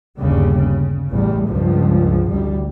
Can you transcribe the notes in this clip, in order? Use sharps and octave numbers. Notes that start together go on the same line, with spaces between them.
G1 D#2 C#3 G3
C#3
A1 E2 G3
C#2 G2 F3
A1 D2 G3